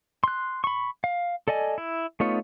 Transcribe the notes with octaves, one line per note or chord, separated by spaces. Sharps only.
C6 F#6
B5 C#6
F5
A4 D5 D#5 G#5
E4
A3 B3 D#4 F4 C#5